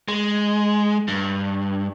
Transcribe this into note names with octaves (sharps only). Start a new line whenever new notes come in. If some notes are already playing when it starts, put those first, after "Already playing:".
G#3
G2